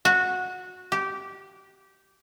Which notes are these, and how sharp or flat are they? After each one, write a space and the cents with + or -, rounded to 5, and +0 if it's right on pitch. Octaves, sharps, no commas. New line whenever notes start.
F#4 -15
G4 -15